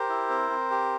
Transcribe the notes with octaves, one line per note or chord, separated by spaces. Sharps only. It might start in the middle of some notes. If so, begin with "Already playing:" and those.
Already playing: G4 A#4 C5
E4
C4
C4
G4